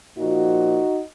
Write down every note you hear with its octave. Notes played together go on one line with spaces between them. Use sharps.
A#2 F3 D#4 F#4